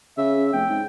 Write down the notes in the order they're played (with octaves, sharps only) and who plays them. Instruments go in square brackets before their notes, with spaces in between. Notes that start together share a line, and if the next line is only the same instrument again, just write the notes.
[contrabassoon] C#3 [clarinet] E5
[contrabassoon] F1 [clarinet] G5
[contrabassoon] G#2